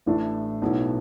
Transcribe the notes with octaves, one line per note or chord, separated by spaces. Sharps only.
A1 A2 A3 D4
B1 B2 F#3 A3 E4